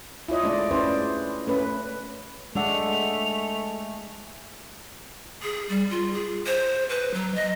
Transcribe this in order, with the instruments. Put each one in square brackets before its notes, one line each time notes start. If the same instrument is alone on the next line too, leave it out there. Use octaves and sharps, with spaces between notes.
[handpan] E4 F4 C#5 D#5
G#3 A3 D4 D5
C#4 E4 G#4 B4 C5 D5
A3 C#4 B4
[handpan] G#3 [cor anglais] A3 [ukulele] D4 A4 F#5 [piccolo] F7
[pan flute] G#4
G3
F4
G#4
C5
B4
F#3
D#5